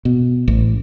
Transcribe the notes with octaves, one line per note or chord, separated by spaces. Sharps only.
B2
A1